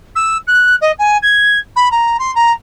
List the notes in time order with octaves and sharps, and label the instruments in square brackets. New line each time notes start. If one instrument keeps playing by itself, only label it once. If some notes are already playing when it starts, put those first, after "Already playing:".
[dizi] E6
F#6
D#5
G#5
G#6
B5
A#5
C6
A#5